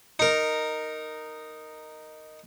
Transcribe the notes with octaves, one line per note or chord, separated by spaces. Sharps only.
D#4 A#4